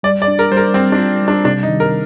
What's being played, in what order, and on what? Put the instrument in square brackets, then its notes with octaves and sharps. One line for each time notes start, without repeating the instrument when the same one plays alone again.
[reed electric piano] G3 [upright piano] D5
[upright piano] D5
[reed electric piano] D4
[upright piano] A#4
[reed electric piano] G3 [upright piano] C5
[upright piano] A#4
[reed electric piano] G3 [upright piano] C4
[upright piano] D4
[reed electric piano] F4
G3
[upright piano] D4
[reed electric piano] C3 [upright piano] D4
[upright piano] D#4
[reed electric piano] D#3
[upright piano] A#4